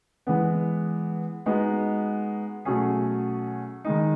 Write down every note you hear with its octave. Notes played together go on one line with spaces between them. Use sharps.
E3 G#3 B3
G#3 B3 D#4 F#4
B2 F#3 A3 C#4 G#4
D#3 G#3 D#4